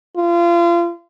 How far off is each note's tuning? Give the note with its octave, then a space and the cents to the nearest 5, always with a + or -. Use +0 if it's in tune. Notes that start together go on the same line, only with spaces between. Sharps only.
F4 -30